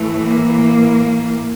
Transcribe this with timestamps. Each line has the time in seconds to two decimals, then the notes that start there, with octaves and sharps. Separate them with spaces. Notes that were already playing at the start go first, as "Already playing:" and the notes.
Already playing: A2 E3 A3
0.24 A#3